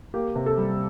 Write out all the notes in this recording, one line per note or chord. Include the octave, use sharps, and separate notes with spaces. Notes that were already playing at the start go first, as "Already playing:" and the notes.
A#3 G4
C3
A4
G3